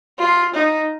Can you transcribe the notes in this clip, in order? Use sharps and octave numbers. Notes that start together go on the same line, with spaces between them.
F4
D#4